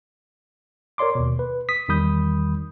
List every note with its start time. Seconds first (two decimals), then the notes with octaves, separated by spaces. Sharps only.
0.98 A#4 C#5 D5 C6 D6
1.15 D#2 B2
1.39 B4
1.69 D#6 B6
1.89 E2 D#3 G3 B5 D#6 G6